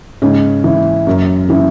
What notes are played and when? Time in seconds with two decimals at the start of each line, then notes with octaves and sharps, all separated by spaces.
0.22 G#2 C#3 C#4
0.64 E3
1.07 F#2
1.48 C#3 E3